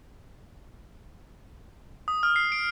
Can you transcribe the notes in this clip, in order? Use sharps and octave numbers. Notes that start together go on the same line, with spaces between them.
D#6
F6
C7
D7